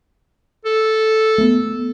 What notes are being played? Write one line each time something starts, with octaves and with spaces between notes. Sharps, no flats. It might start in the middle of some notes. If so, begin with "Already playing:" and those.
A4
A3 B3